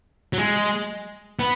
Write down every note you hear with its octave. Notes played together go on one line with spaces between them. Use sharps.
F#3
G#3
B3